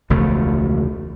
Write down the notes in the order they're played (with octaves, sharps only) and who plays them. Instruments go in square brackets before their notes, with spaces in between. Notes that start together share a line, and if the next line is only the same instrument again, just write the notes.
[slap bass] E1 C#2 F3 A3